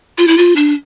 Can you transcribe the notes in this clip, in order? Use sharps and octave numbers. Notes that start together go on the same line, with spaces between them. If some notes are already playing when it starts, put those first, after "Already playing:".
F4
E4
F4
D4